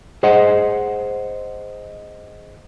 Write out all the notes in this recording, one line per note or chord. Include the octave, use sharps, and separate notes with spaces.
G#4 C5 D#5 F#5